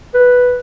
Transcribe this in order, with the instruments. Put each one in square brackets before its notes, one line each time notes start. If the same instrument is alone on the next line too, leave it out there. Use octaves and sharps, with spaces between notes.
[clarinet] B4